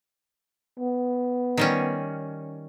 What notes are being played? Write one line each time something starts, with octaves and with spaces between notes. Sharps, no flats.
B3
D#3 G3 C#4